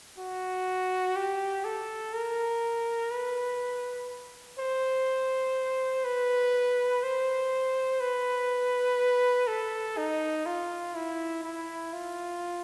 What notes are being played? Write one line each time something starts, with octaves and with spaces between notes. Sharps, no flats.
F#4
G4
A4
A#4
B4
C5
B4
C5
B4
A4
D#4
F4
E4
E4
F4